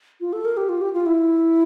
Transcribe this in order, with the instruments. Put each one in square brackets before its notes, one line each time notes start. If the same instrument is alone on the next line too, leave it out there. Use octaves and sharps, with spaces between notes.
[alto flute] F4
A4
A#4
G4
F4
G4
F4
E4